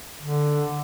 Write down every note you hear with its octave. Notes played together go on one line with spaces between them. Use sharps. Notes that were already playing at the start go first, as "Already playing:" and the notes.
D3